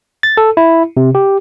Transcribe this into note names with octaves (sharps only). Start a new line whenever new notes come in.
A6
A4
E4
C3
G4